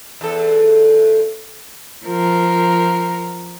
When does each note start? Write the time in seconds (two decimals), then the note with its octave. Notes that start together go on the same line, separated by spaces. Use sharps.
0.21 E2 A4
2.05 F3 A#4